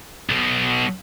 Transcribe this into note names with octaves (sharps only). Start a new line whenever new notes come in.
B1 B2